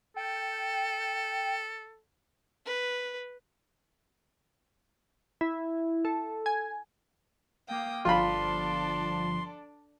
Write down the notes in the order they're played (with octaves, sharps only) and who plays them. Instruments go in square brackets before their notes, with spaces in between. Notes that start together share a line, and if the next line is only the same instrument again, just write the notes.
[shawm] A4 [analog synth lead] G5
[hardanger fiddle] B4
[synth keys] E4
A4
G#5
[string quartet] A#3 G5 D#6 [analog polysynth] F5 D6
[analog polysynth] G1 F3 [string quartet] D4 A4 D5 [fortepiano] F4 B5 [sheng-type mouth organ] C6